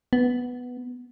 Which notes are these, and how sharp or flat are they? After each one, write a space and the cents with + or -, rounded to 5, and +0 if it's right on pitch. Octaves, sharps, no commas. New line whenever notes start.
B3 +0